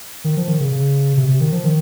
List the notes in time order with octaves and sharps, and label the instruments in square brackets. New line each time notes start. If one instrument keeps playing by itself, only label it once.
[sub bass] D#3
F3
D#3
C#3
C#3
C3
C3
D#3
F3
D#3